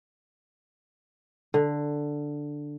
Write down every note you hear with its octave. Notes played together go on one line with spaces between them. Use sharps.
D3